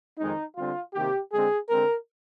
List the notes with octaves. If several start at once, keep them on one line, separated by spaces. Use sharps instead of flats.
F2 D#3 G#3 C4 D#4
D3 G3 C4 F4
C3 D#3 A#3 G4
D3 G#3 C4 G#4
D3 G#3 C4 A#4